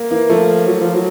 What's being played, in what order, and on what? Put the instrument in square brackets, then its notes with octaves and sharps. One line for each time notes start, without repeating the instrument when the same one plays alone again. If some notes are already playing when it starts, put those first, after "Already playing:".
Already playing: [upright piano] A#3
[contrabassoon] E3 [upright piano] A#3
[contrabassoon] F3 [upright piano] A3
[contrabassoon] F#3
F3
F#3